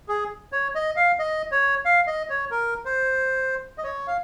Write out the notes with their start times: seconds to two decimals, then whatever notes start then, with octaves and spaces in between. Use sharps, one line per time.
0.09 G#4
0.53 C#5
0.75 D#5
0.96 F5
1.19 D#5
1.52 C#5
1.85 F5
2.07 D#5
2.30 C#5
2.51 A#4
2.85 C5
3.78 D#5
3.84 C#5
4.07 F5